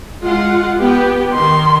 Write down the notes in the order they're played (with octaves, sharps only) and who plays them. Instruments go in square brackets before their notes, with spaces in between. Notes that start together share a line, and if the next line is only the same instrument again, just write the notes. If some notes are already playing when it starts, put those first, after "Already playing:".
[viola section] G#3 F4 F#5
B3 G4
[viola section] D#3 [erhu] C6